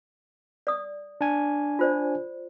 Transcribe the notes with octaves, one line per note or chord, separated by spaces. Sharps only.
D5 D#6
D4 G#5
F4 C5 D5